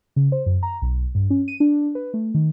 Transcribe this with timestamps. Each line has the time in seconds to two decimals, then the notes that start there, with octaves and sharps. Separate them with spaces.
0.16 C#3
0.32 C5
0.46 F#2
0.63 A#5
0.82 B1
1.15 G2
1.30 C#4
1.48 D#7
1.60 D4
1.95 B4
2.14 A3
2.34 D#3